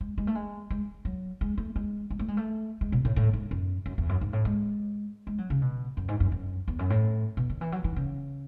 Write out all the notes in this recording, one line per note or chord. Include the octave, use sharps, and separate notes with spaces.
G#3
G#3
A3
G#3
G#3
F#3
G#3
A3
G#3
G#3
A3
G#3
A3
G#3
B2
A2
A2
G#2
F#2
F#2
E2
F#2
G#2
A2
G#3
G#3
F#3
C#3
B2
F#2
G#2
F#2
F#2
E2
F#2
A2
B2
D#3
E3
F#3
E3
C#3